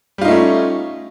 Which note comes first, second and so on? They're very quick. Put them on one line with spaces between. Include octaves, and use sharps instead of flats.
G3 F4 D#4 A3 C#4